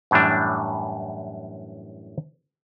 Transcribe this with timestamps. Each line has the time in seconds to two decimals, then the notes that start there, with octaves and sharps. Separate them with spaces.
0.11 F#2 A2 E3 G3 D4